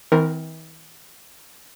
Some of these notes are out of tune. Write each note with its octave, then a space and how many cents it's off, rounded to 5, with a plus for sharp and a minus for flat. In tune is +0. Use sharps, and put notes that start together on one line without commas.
E3 -45 C4 -35 A#4 +0